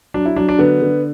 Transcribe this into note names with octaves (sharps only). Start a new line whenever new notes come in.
F#3 D4
E4
F#3 D4
D4
D3 B3
D3